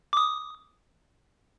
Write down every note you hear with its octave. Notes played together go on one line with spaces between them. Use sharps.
D6 D#6